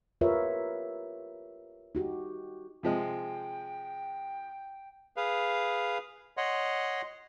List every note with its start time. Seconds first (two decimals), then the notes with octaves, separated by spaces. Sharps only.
0.21 F4 G4 A#4 B4 C#5 E5
1.95 D#4 F#4 G4
2.83 C3 F3 G#3 G5
5.17 G#4 B4 F5
6.37 C#5 D#5 F#5 C6